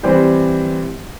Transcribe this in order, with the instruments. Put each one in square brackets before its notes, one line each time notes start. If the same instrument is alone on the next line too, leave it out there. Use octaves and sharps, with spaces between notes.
[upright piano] E3 G3 C4 G4 C5